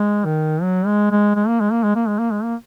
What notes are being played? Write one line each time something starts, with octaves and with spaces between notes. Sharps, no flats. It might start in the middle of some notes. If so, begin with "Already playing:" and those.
Already playing: G#3
D#3
F#3
G#3
G#3
G#3
A#3
G#3
A#3
G#3
A#3
G#3
A#3
G#3
A#3